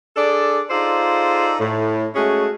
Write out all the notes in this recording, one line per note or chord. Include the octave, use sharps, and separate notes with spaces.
D4 G#4 A4 D5
D#4 F4 G#4 A4 C5 D5
A2
G#3 A3 C#4 F#4 G#4